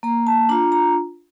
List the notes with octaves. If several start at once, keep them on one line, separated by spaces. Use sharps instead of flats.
A#3 A#5
A5
D4 F4 A#5
A#5